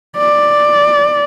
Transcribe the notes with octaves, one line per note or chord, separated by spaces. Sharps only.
D5